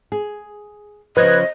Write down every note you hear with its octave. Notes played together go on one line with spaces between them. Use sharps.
G#4
C#3 F3 B4 D#5 F#6 G#6